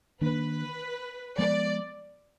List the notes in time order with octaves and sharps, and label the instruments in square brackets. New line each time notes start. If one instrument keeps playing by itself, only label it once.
[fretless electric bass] D#3 A#3 D4 [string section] B4
[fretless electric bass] F3 G#3 B3 [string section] D5